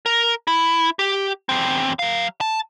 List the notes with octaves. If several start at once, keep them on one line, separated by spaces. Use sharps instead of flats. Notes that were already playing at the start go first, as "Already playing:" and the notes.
A#4
E4
G4
E2 C4
F#3 F5
A5